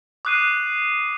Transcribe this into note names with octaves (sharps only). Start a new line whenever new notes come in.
D6 D#6 F#6 C7 D#7